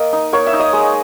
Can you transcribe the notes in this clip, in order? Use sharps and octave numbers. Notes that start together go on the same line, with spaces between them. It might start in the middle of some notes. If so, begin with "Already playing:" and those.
Already playing: A#3 D#5
D#4
A#3 C#5 C#6
E5 E6
D#4
D#5 D#6
G#3